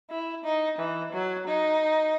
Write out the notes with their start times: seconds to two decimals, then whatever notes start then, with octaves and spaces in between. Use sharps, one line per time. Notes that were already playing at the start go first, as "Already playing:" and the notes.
0.10 E4
0.44 D#4
0.78 E3
1.13 F#3
1.48 D#4